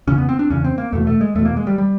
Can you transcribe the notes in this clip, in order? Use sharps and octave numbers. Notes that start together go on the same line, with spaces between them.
E2 C#3 C#4
B3
C4
D4
E2 C#3 C#4
C4
A#3
E2 B2 A3
A3
G#3
E2 B2 A3
A#3
G#3
G3
G3